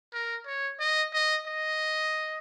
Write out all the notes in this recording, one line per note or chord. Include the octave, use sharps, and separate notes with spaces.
A#4
C#5
D#5
D#5
D#5